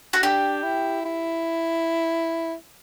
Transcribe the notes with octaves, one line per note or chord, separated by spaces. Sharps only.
F#4
D4 G4
E4
E4